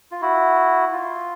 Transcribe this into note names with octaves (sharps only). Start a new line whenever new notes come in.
F4
E4 F#4
F4